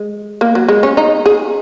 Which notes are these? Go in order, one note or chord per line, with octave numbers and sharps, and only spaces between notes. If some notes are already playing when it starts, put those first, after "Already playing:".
Already playing: G#3
A#3
F#3
G#3
C#4
D#4
G#4